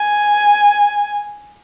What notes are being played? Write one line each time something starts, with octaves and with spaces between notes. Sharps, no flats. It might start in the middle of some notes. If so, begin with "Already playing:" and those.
Already playing: G#5